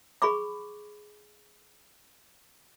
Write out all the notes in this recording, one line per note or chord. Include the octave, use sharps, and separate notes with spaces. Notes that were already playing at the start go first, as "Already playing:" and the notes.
G#4 B5 C#6 D6